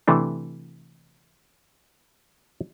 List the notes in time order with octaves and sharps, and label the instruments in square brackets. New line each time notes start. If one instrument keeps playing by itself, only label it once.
[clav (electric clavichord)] C3 E3 A3 D4